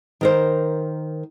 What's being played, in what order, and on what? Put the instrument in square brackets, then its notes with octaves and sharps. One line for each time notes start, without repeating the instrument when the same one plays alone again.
[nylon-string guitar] D#3 A#4 C5